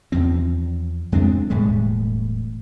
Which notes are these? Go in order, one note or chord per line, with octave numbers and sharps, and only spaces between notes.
E2 F3 C4
F2 G#3 C4 D4
E1 A2 G3 G#3